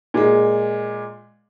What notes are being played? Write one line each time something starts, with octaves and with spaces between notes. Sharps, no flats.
A#2 G#3